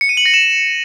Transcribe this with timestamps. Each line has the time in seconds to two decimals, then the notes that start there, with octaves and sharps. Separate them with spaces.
0.01 C#7
0.09 D#7
0.17 F#7
0.26 A#6
0.34 E7